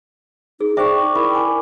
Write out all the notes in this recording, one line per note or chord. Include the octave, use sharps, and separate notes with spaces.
D#4 G#4
D#4 G#4 C5 D5 E5 G5 C#6
E4 A#4
G#5